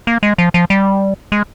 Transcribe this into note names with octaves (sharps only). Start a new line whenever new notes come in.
A#3
G#3
F3
F3
G3
G#3